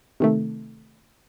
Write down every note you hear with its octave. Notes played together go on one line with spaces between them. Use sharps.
C3 D#3 A3